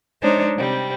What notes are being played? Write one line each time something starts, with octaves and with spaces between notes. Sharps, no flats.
G#3 D4 D#4 C5 C#5
C3 G3 C4